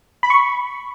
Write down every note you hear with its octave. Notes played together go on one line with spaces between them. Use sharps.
B5
C#6